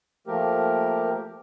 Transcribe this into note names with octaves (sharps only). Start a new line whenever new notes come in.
F3 A3 A#3 G4 A#4